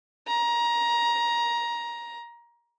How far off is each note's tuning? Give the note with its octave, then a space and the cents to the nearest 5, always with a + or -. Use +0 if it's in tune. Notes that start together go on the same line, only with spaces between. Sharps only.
A#5 +20